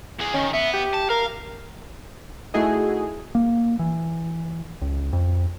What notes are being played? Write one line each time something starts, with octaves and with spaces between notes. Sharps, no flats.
E2 G#4
D#3 C#4
B3 E5
G4
A5
A#4 F5
A3 D#4 E4 F#4 G#4 D#5
A#3
E3
C#2
F2